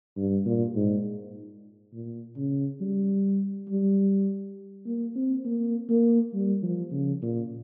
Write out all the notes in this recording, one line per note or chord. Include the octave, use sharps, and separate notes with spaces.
G2
A#2
G#2
A#2
C#3
G3
G3
A#3
C4
A#3
A#3
G3
F3
C#3
A#2